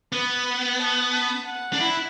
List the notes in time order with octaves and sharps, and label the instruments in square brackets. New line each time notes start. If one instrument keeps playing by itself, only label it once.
[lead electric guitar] B3 [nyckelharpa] B4
[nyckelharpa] B4
A5
A5
F#5
[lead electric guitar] D4
[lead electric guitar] E4 [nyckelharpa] F#5